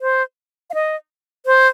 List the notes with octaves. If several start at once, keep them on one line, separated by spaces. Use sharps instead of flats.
C5
F5
D#5
C5